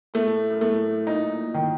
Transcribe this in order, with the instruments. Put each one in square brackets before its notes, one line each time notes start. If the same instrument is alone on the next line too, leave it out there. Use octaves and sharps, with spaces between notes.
[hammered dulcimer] A2 [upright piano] A3
[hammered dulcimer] F#2
[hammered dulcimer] A2 [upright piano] A3
[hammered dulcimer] A#2 [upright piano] D#4
[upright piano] D#3